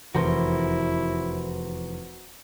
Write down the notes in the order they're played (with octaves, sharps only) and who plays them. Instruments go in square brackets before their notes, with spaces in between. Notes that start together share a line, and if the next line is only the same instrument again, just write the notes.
[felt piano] F1 E2 [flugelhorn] E4 [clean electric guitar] F#4 A#4 C5